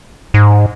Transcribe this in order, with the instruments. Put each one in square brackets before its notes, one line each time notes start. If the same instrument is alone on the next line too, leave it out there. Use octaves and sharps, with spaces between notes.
[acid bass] G#2